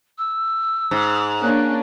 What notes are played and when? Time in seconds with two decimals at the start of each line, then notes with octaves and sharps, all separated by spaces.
0.18 E6
0.91 G#2
1.41 A#3 C#4 D4 F#6